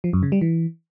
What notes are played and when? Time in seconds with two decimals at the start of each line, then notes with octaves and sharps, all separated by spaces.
0.04 F3
0.13 F#2
0.23 C#3
0.32 G3
0.41 E3